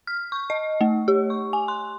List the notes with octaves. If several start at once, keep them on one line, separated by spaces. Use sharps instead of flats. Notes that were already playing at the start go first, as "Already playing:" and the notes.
F6
C#6
D#5
A3
G4
C#6
G#5
C6